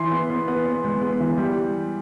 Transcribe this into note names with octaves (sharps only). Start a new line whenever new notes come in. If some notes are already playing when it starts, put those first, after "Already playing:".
Already playing: E3 C6
B3
B3
B3
B3
G#3
B3
E3
G3